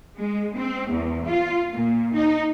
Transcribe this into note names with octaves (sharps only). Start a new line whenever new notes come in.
G#3
C4
E2
F4
A#2
D#4